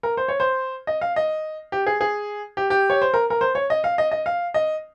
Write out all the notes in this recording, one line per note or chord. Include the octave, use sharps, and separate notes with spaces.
A#4
C5
C#5
C5
D#5
F5
D#5
G4
G#4
G#4
G4
G4
C#5
C5
A#4
A#4
C5
C#5
D#5
F5
D#5
D#5
F5
D#5